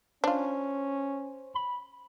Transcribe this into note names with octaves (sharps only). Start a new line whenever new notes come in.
C#4 D4 F4 C5
B5